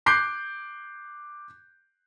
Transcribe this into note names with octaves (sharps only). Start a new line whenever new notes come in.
D6 F#6 G6 C7 D7